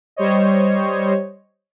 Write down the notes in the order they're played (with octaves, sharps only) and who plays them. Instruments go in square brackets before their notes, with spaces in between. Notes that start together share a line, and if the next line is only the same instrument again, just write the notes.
[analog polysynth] G3 C5 C#5 D#5